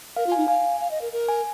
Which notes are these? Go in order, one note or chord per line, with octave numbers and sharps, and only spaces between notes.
A#4 F5
F4
G#5
D#4
F5 G#5
F5
D#5
A#4
A#4
G#5